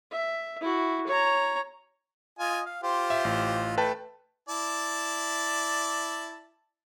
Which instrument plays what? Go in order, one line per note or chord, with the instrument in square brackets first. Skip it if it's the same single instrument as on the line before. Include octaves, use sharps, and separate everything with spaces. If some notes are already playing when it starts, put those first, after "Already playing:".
[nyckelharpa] E5
E4 F#4
C#5 A#5
[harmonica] F4 D#5 G#5
F5
F4 G4 C5
[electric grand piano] E5
A1
[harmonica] A3 [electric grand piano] B4 G5 A5
[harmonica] E4 D5 A5